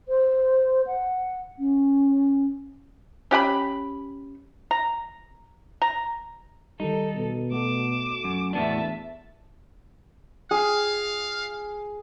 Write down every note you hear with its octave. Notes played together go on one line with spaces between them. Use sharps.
C5
F#5
C#4
C#4 G4 F#5 B5
A#5
A#5
D#3 G3 D#4 A4
B2
A3 F#4 A4 D6 E7
F#2
E2 A2 B3 D4 E5 A5
G#4 F5